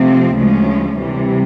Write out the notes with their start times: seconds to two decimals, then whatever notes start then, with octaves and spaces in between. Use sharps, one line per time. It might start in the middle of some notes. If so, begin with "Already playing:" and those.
Already playing: C3 F3 A3 C4
0.36 D2 C#3 F3 G#3 C#4
0.99 C3 E3 G3